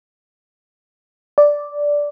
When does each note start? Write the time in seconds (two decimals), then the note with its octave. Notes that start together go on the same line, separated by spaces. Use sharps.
1.38 D5